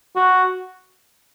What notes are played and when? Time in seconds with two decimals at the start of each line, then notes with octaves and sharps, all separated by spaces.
0.15 F#4